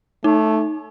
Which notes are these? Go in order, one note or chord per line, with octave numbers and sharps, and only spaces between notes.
A3 D#4